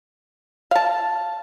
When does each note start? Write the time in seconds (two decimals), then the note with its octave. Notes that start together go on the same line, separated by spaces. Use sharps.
0.71 F5 A5